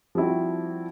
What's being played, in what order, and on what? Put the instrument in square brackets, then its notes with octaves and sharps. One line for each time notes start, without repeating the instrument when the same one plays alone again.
[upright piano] F3 G3 C4 E4 F#4